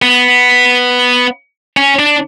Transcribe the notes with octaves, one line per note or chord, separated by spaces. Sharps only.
B3
C#4
D4